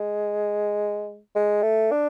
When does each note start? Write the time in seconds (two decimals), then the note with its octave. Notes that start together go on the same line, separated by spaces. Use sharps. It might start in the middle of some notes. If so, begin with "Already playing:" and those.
Already playing: G#3
1.35 G#3
1.63 A3
1.92 D4